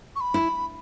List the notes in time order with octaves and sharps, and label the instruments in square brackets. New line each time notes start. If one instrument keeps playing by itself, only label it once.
[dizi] C#6
B5
[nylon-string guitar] E4